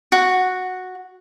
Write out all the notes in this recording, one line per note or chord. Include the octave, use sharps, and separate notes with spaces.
F#4